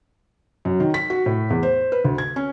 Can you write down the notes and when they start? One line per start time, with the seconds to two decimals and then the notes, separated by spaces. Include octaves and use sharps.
0.65 F#2
0.80 D#3
0.94 B6
1.10 F#4
1.26 A2
1.50 E2
1.63 C5
1.92 B4
2.04 D2
2.18 G#6
2.36 C#4